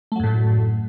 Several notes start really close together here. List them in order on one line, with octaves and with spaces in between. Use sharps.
A3 F#3 F#2 A2